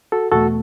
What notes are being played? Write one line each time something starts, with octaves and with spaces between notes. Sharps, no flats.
F#4 A4
E2 B2 A3 F#4 A4